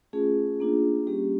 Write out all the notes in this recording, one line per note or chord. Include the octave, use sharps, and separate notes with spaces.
A3 C#4 F4 G#4
A#3 D4 F4
G3 A#3 C#4 G4